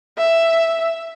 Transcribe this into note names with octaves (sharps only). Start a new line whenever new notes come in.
E5